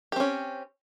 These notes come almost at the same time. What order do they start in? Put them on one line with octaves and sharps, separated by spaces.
G4 C4 C#4